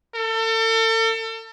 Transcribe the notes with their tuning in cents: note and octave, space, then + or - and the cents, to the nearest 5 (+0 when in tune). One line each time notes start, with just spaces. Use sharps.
A4 +35